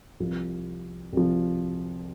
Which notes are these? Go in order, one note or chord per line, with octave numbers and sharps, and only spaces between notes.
C2 C3 F3
C2 C3 F3